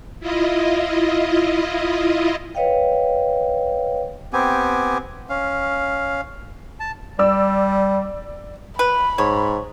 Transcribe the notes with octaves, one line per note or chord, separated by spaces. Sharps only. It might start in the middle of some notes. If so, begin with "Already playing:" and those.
E4 F4 D#5
B4 C#5 D#5 F5 G5
B3 C4 G4 G#5
C#4 F5
A5
G3 D5 E6
B4 B5
G#2 C#5